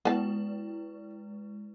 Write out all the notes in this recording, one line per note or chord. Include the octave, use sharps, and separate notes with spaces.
G#3 B3 E4 B4 A5